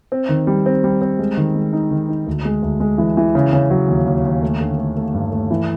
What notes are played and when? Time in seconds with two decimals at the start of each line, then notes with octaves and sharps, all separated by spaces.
0.12 C4
0.29 D#3
0.47 G3
0.66 C4
0.84 G3
1.02 C4
1.19 G#3
1.37 D#3
1.55 G#3
1.73 D#4
1.91 D#3
2.08 D#4
2.26 D2
2.45 G#3
2.62 D2
2.80 G#3
2.98 E3
3.17 E3
3.35 C#3
3.53 C#3
3.70 F#3
3.88 D#2
4.06 D#2
4.25 D#2
4.42 A3
4.61 D3
4.78 A3
4.97 A3
5.14 G2
5.31 A3
5.51 E3